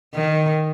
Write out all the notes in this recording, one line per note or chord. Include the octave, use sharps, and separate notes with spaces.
D#3